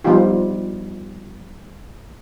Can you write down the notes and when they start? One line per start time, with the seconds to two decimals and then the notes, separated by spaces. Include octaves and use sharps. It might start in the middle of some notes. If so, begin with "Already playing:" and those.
0.04 F3 G3 B3 D#4 F4 G4